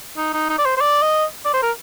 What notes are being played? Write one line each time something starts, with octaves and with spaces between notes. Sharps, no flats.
D#4
D#4
D#4
D5
C5
C5
D5
D#5
D5
C5
A#4